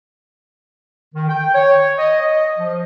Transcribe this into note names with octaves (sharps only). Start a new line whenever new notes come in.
D#3
G5
C#5
D#5
D#5
F3